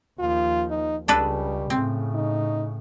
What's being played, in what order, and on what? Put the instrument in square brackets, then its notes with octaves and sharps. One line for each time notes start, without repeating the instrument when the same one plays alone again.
[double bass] D#2 F3 [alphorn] F4
[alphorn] D#4
[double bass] C#2 C#3 [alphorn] G3 [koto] D4 A4 B4
[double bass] A2 C#3 [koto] C4
[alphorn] D#4